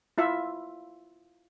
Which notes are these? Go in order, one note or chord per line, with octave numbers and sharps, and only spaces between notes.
E4 F4 E5